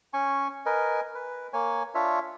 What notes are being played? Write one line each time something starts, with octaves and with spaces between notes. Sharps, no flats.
C#4 G#5 C#6
A#4 B4 D#5 G#5
B4
A#3 C#5 G#5
D4 F4 C#5 E5